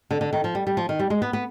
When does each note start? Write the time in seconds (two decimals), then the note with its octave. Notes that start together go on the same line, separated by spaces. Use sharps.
0.11 D3
0.21 D3
0.33 D#3
0.44 F3
0.55 G3
0.67 G3
0.77 F3
0.89 D#3
0.99 G3
1.10 G#3
1.22 B3
1.33 B3